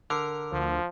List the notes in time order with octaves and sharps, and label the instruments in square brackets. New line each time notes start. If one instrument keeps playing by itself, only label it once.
[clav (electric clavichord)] D3 [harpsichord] A#4
[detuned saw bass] D2 [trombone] F3